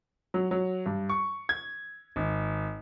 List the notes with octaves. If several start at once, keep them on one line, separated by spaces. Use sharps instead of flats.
F#3
F#3
G2
C#6
G#6
G#1